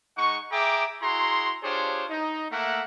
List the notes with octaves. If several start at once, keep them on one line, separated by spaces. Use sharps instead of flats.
G#3 D#4 F#5 C#6
G#4 E5 G5 A#5 D6
E4 F#4 G#4 A#5 C6
D4 F4 G4 G#4 C5 C#5
D#4
A3 A#3 A#4 E5 F#5